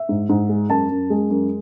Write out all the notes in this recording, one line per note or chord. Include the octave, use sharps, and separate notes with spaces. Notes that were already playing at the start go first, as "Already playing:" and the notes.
Already playing: E5
G#2
G#2
G#3
F#2 A5
F#2
G#3
F#2